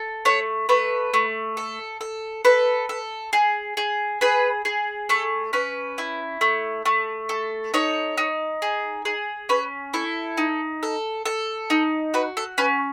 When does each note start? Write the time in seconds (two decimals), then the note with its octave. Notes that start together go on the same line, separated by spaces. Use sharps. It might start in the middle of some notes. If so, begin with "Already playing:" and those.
Already playing: A4
0.25 A3 C#5
0.69 A3 B4
1.14 A3
1.57 A4
2.01 A4
2.45 A4 B4
2.89 A4
3.33 G#4
3.77 G#4
4.21 G#4 B4
4.65 G#4
5.09 A3 A4
5.53 C#4 B4
5.98 E4
6.41 A3
6.85 A3
7.29 A4
7.74 D#4 C#5
8.18 D#4
8.62 G#4
9.05 G#4
9.49 C#4 B4
9.94 E4 A4
10.37 D#4
10.83 A4
11.25 A4
11.70 D#4
12.14 F#4 B4
12.37 A4
12.58 C#4 B4